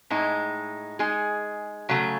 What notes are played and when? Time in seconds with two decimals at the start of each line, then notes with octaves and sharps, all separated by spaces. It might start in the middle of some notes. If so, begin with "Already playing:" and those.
0.10 A2 G#3 D#4
0.99 G#3 D#4 G#4
1.89 C#3 F#3 A3